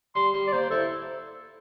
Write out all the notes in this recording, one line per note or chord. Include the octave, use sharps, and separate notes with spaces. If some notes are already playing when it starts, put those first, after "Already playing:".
G3 C6
G3
D5
A#3 C5
E4 A4